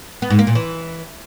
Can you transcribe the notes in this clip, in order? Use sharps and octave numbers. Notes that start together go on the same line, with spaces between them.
B3
G#2
A#3
A#2
E3